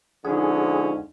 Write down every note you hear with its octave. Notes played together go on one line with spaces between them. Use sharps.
D3 F3 G#3 C#4 D#4 G#4 F#5